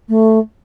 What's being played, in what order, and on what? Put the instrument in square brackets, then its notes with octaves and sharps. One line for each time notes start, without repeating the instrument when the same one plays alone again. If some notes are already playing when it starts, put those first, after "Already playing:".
[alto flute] A3